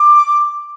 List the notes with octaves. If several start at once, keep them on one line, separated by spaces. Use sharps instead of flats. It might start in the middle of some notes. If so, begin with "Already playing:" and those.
Already playing: D6